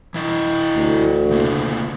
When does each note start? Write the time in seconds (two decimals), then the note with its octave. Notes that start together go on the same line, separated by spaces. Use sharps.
0.14 E3 E4 D#5
0.76 D2
1.31 C#3 A#3 B3